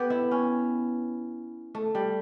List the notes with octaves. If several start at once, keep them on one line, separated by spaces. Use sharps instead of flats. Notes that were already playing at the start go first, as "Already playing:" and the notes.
Already playing: B3 G4
E4
C#4
A3
G3